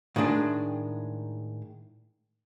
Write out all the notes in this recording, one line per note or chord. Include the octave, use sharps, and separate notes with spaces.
A2 D#3 G#3 D4 G#4